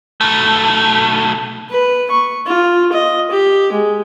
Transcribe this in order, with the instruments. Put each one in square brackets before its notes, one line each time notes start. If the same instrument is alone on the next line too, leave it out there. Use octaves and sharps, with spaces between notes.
[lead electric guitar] B1 A3
[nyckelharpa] B4
C#6
F4
D#5
G4
G#3